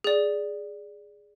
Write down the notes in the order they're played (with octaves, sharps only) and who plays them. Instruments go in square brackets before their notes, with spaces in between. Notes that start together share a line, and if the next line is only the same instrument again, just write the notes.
[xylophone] G#4 D5